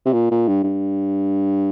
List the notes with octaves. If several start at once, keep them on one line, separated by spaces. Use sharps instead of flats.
C3
A#2
A#2
G2
G2